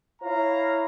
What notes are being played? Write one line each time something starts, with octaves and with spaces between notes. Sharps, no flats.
E4 C#5 F5 A#5